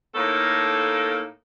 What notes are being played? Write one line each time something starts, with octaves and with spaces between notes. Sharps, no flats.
A2 A#3 D#4 A4 A#4